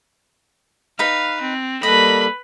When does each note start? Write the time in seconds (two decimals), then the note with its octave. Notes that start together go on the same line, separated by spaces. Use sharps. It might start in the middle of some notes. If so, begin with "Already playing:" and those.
0.99 D#4 B4 F5
1.41 C4
1.83 G3 A#3 A4 B4 D#5 B5